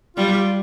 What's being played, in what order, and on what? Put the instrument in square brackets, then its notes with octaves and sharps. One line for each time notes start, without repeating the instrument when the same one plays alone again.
[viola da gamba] G3 [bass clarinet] F4
[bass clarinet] G4
F4